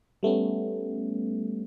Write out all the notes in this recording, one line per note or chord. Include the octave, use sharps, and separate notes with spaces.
G3 A3 B3 C#4